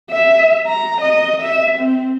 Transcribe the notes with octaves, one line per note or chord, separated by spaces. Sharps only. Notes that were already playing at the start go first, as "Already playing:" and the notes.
E5
A#5
D#5
E5
C4